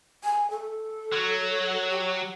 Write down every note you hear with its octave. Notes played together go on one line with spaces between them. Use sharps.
G#5
A4
F#3
G4